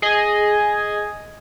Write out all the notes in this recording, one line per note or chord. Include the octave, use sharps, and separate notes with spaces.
G#4 D#5 G#5